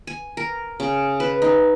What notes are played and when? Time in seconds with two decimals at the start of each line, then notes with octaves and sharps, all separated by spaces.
0.07 G#5
0.37 A#4
0.80 C#3
1.20 B4
1.42 D#4